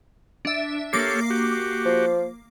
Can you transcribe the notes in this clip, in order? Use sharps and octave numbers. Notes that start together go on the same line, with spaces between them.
D4 E5
A#3 G4 A4 C#5 D6 C7
F#4 G4
F3